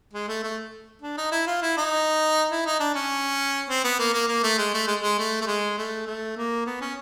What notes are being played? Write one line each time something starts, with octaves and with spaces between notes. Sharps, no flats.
G#3
A3
A3
D4
D#4
E4
F4
E4
D#4
E4
D#4
D4
C#4
C4
B3
A#3
A#3
A#3
A3
G#3
A3
G#3
G#3
A3
A3
G#3
A3
A3
A#3
B3
C#4